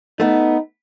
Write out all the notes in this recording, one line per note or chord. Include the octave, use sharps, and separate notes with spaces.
A3 B3 D#4